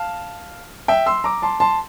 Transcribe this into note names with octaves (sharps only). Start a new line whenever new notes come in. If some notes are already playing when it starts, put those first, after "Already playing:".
Already playing: F5 A5
E5 G5
C6 E6
A#5 D6
A5 C6
A5 C6